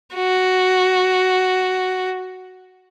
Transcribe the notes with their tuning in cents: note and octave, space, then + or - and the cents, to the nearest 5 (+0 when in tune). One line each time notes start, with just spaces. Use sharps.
F#4 +5